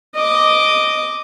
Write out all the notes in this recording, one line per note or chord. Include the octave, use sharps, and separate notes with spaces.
D#5 D6